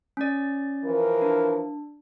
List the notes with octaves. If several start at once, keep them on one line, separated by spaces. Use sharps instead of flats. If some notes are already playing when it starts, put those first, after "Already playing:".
C#4 D5
E3 F3 A#4
D4